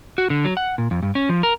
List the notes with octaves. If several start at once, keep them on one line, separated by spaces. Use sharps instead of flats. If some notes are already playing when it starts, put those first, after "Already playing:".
F#4
D3
F#3
F#5
A#2
F2
G2
C#4
F3
A#4